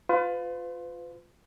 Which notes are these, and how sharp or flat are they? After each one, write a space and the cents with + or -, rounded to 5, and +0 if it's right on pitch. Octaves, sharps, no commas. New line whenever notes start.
F4 +15 B4 +40